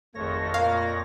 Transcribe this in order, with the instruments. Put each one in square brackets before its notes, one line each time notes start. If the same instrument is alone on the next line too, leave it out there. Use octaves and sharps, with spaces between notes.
[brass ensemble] G#1 A3 [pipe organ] F2 C#5 A#6
[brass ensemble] A#2 A#3 [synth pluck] F5